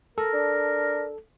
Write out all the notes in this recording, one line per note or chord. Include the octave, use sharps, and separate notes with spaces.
A4 A#4
D4